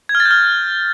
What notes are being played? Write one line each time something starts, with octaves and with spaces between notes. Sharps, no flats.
G#6
F6
A6
G6
F6